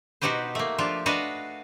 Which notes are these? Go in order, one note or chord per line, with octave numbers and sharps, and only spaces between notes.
B2 D#4 F#4 G4 B4 C5
A3 A#3
F3 D4 F4 G4
D4 F#4 B4 D#5 F5